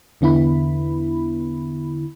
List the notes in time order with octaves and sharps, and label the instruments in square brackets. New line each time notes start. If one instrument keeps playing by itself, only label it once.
[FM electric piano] E2 D3 B3 E4 B5